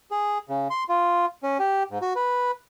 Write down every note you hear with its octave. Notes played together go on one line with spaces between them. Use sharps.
G#4
C#3
C6
F4
C#4
G4
G#2
F#4
B4